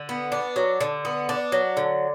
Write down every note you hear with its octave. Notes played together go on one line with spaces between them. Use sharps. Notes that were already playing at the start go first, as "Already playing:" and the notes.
Already playing: D3
B3
D4
F#3
D3
B3
D4
F#3
D3